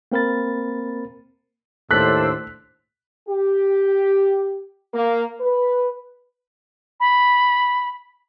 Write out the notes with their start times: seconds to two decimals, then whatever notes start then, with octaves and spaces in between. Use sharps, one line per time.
0.12 A#3 C4 A#4 B5 A6
1.91 D#2 A2 D4 C5 E6 F#6 B6
3.29 G4
4.94 A#3
5.41 B4
7.00 B5